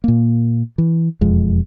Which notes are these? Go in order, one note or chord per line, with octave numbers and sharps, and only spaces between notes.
A#2 A#3
E3
E1 F2 G#3